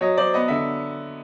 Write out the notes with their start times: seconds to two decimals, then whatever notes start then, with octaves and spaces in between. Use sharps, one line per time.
0.01 F#3 C#5 D#5
0.18 F#3 C5 D5
0.34 B3 D#5
0.48 D3 E5